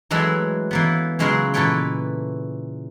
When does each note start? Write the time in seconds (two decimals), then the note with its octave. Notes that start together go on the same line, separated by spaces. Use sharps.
0.11 E3 F#3 G#3 A3 E4
0.71 E3 A#3 B3
1.19 C#3 F#3 G#3 E4 F4 A#4
1.54 A#2 E3 A4 B4 C#5 G5